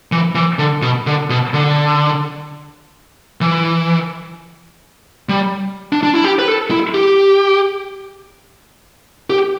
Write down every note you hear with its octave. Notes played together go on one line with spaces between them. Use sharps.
E3
E3
D3
B2
D3
B2
D3
E3
G3
D4
D4
E4
G4
B4
A4
E4
G4
G4